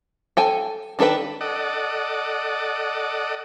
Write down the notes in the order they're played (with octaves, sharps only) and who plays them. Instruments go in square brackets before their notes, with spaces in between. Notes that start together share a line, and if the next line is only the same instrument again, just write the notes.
[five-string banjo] A4 G5 G#5
D#3 D4 A4 B4 G5
[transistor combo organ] A4 D5 D#5 F#5